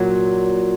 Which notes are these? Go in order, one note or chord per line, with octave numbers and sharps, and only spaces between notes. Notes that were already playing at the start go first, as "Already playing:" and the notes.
Already playing: A#2 F#3